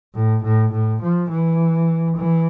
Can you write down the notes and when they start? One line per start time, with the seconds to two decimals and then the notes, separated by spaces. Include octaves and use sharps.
0.15 A2
0.44 A2
0.72 A2
1.02 F3
1.30 E3
2.17 E3